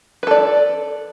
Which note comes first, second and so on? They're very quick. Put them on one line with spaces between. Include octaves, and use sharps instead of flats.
B4 A4 D5